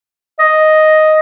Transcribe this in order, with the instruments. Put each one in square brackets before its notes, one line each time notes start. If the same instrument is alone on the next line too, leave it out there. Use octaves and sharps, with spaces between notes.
[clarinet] D#5